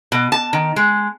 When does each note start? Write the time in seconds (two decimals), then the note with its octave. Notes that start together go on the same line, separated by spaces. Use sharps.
0.12 B2
0.32 A5
0.53 D#3
0.76 G#3